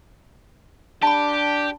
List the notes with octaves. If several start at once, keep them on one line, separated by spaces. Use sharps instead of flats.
D4 G4 A5 B5